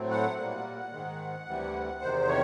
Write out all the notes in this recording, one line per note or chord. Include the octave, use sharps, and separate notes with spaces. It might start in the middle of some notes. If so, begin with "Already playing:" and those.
Already playing: A2 F#3 A3 C4
F#5
A#2 G3 A#3 F#5
G#2 D#3 G#3
D2 C3 E3 G3
E2 C3 D#3 C5
C#5